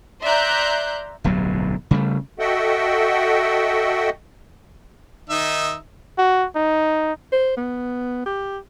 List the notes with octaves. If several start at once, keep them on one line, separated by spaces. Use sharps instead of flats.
D5 E5 A#5 C6 F#6 G6
D1 B1 G2 F#3
C#3 G3 A3
F#4 A4 D#5 E5 F#5 G5
D#3 D#4 E5
F#4
D#4
C5
B3
G4